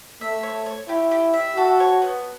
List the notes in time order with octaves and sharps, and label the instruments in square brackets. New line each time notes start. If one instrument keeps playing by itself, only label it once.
[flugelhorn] A3 [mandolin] E5
[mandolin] C#5
C#5
[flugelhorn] E4 [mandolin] G4
[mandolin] G4
E5
[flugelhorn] F#4 [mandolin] A4
[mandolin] C#5
B3